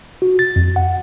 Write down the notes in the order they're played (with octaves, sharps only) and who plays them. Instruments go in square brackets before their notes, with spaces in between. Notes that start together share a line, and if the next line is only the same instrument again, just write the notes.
[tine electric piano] F#4
A6
F2
F#5